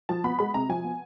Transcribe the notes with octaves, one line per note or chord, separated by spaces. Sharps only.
F3 A5
B3 B5
G#3 B5
C3 A#5
F3 G#5
B3